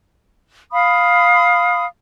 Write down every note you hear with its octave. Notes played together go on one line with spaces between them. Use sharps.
F5 B5 D#6